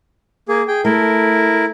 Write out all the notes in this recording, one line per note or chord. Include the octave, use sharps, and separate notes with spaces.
A#3 G#4
G#4 G5
A3 E4 A#4